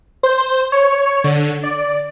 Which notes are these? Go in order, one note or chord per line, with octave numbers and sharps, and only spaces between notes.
C5
C#5
D3
D5